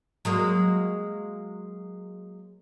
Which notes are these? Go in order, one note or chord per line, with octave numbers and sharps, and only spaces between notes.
F#3 G#3 A#3